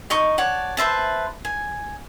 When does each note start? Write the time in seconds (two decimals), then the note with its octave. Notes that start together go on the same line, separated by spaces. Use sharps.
0.10 D#4 D#5 C#6
0.38 C#5 D5 F#5 A5
0.77 B4 C5 E5 A5
1.45 G#5